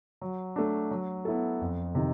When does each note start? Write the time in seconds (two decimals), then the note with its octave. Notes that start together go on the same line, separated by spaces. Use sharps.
0.21 F#3
0.56 A3 D4
0.91 F#3
1.25 B3 E4 A4
1.61 F2
1.95 C3 D#3